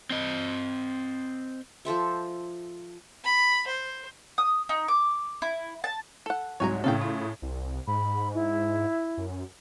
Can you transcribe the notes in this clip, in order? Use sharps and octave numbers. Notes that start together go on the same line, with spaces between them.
C4 D#5
F3 A4 C5 E5
B5
C5
D#6
D#4
D6
E4
A5
A4 F#5
C2 G#2 F#3 C#5 G#5 A#5
A2 C#3 C#4 A4 F5 G5
F4
C2
G#2 B5
E4
F#2